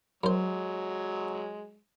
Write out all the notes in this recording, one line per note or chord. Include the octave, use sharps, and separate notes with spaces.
F#2 F#3 G#3 C5